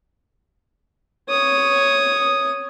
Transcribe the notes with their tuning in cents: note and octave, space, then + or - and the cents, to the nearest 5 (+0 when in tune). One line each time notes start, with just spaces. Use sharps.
C#5 +0 D#6 +0